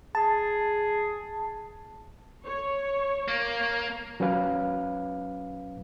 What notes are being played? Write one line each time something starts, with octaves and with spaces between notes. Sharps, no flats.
G#4 A5
C#5
A#3
F#3 C#4 B4 F5